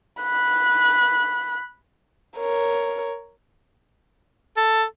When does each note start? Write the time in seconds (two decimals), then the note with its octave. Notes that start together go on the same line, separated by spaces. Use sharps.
0.22 B5 F#6
2.37 A#4 C#5
4.57 A4